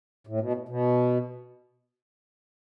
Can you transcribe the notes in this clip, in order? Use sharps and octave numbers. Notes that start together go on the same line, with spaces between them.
A2
B2
A2
B2